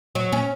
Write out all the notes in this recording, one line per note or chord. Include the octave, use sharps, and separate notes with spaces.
F#3
C#4